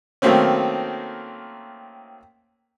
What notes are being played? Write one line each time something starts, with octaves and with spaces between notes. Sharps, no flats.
D#3 F#3 A3 A#3 C4 C#4